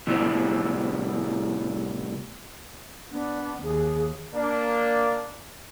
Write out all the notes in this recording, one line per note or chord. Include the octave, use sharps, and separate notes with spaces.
A2 C3 G3 B3 E4
B3 D4
D#2 G#4
A#3 D4